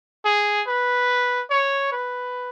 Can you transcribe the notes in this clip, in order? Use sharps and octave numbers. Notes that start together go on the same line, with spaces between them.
G#4
B4
C#5
B4